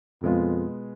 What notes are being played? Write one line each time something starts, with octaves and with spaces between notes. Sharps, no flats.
F2 B2 G#3 B3 F4